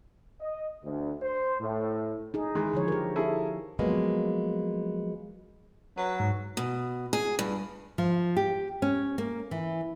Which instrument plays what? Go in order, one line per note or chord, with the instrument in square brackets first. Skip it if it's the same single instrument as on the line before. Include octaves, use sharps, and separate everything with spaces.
[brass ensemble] D#5
D2
C5
A2
[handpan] D#4 G#4
[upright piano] D#3 E3 G#3
[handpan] D3 F3 C#5
G4 A#4
[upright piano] E4 G#4 A4
[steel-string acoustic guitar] F3 F#3 G#3 A#3 B3
[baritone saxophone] F#3 [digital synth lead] B4
[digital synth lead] G#2
[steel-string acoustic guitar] B2
G#4
G2
[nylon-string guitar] F3
G4
C#4
A#3
E3